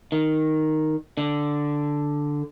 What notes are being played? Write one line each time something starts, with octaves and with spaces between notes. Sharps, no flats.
D#3
D3